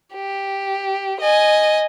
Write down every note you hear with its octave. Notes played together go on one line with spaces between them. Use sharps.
G4
D#5 G#5